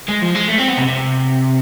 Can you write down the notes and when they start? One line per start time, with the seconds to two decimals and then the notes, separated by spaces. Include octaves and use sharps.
0.08 G#3
0.22 F3
0.35 G#3
0.48 A3
0.58 C4
0.68 B3
0.77 C3
0.88 C3